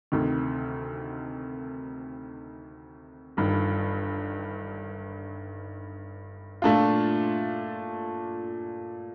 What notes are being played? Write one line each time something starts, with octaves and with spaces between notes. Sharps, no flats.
D2 C3 D#3
G1 G2 D#3
A#2 A3 D4 F4